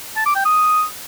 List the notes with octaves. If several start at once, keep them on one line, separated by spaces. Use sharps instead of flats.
A5
D6
G5
D#6